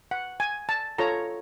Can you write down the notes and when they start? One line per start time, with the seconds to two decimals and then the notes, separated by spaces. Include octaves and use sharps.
0.11 F#5
0.40 G#5
0.69 A5
0.98 F4 A4 C#5 A#5